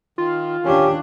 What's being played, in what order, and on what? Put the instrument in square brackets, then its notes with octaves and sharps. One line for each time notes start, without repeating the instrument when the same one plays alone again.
[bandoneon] D#3 [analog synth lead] F4
[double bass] D#2 D4 [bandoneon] C#4 [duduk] G4